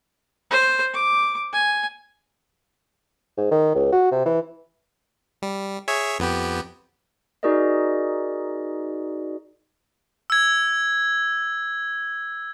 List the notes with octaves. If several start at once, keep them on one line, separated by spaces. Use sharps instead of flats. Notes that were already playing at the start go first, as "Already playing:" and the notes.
C5
D6
G#5
G#2
D#3
C#2
F#4
C3
E3
G3
G#4 C#5 E5
F2 B3 G4
D#4 F#4 G#4 A#4 D5 D#5
E6 G#6